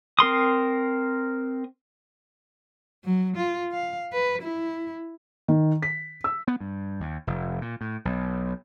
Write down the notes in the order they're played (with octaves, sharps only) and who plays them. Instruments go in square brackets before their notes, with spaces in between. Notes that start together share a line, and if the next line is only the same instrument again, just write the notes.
[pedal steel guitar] C4 A#4 C6 D#6
[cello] F#3
F4
F5
B4
E4
[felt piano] D#3
B6
E6
[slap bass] B3
G2
D#2
F1
A#2
A2
B1